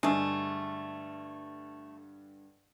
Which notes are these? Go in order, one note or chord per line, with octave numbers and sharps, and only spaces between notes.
G2 D3 G#3 A3